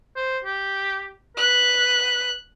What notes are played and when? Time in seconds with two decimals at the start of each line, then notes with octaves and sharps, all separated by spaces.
0.16 C5
0.45 G4
1.37 B4 F#6